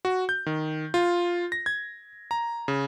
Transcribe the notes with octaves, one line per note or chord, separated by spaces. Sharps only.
F#4
G6
D#3
F4
A#6
G#6
A#5
C#3